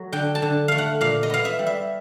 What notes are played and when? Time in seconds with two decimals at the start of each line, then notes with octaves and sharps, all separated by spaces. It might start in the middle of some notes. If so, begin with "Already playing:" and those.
Already playing: F#3 A3
0.12 D3 G5
0.35 A5
0.42 D3
0.68 A3 F5
0.78 F#5
1.01 A#2 F5
1.23 D#5
1.30 B3 F5
1.45 E5
1.59 G3
1.67 E5